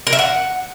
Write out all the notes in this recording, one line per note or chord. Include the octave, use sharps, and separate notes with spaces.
A#4
E5
F#5